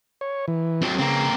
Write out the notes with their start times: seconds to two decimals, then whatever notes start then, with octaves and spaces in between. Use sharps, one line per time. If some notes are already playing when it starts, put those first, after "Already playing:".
0.21 C#5
0.48 E3
0.82 F#3 C4
0.98 C#3 A#3 C4